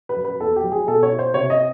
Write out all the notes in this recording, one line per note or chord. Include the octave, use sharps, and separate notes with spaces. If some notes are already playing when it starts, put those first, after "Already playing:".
B4
F#2
B4
E2 A4
G4
F#3
G#4
B2 A4
C#5
E4
C5
C3 C#5
D#5